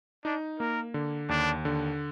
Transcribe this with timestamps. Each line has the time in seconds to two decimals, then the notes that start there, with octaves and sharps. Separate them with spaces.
0.25 D4 D#4
0.60 A#3 A#4
0.94 D3
1.29 D#2 D4
1.65 D3